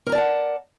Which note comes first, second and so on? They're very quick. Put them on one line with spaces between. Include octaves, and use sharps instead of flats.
A#4 A#5 D5 A5 F#5